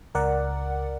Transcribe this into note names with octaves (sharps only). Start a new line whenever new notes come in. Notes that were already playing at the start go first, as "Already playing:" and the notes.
C#2 A#4 D5 F#5